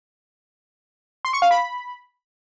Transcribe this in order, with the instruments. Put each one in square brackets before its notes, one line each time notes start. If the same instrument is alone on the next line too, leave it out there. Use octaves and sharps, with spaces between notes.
[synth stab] C6
C#6
F5
B5